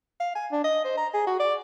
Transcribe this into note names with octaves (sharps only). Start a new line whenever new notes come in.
F5
G#5
D4
D#5
C5
A#5
G#4
F#4
D5